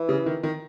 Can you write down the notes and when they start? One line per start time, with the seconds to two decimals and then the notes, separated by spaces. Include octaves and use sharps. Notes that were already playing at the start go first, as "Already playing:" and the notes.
Already playing: E3
0.09 C#3
0.26 D#3
0.43 D#3